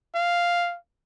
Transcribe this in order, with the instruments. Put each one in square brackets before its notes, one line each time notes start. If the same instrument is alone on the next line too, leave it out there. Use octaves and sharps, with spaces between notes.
[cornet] F5